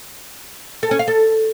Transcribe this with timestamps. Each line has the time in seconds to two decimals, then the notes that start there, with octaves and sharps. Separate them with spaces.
0.83 A4
0.91 C#4
0.99 F5
1.08 A4